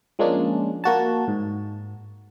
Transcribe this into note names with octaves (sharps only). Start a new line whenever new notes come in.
F3 G#3 A#3 C#4 D4
A#3 F#4 A5
G#2